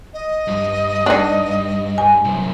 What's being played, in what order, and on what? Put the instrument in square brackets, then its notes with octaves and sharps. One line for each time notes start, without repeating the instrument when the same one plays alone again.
[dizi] D#5
[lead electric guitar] G2
[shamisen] D4 D#4
[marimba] G#5
[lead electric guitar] C2 F#2